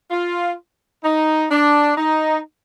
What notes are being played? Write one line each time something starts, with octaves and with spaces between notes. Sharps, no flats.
F4
D#4
D4
D#4